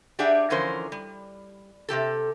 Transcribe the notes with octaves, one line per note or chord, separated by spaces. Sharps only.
D4 G4 G#4 D5 E5 F#5
D3 E3 F3 C#4 A#4 C5
G3
C3 F#3 G4 A4